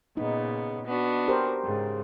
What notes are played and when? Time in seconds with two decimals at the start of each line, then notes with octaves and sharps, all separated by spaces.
0.17 A#2 C#3 B3 D#4
0.86 B3 D4 F#4
1.28 G4 A#4 C5
1.63 G#2 C#3